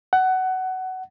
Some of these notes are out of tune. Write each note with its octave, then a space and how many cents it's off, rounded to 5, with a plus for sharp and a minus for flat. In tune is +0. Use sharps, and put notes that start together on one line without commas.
F#5 +20